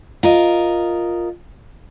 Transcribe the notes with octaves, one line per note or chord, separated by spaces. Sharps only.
F4 A#4 D#5